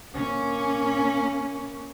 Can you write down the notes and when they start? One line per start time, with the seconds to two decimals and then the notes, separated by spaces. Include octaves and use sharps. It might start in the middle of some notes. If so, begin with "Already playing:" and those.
0.14 A#3 C#4